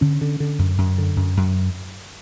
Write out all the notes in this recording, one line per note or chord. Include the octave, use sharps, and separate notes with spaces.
D3 C#4
D3
D3
F#2
F#2
D3
F#2
F#2